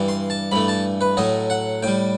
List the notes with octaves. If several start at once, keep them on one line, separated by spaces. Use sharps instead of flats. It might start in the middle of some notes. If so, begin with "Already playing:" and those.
Already playing: G2 E3 G3
C6
A5
G2 E3 A3 B5
A5
B4
A2 F#3 A3 D#5
F#5
A2 G3 G5